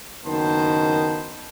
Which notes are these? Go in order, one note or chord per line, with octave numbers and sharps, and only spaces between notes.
F#1 D#3 B3 C5 A5